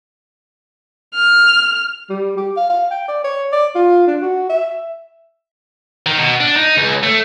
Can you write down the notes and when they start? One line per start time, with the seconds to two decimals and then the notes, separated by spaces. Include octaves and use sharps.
1.15 F6
2.09 G3
2.37 G4
2.56 F5
2.70 F5
2.91 G5
3.08 D5
3.24 C#5
3.52 D5
3.75 F4
4.07 D4
4.22 F#4
4.49 E5
6.06 D#3
6.18 B2
6.40 D4
6.56 D#4
6.77 C#2
7.03 A3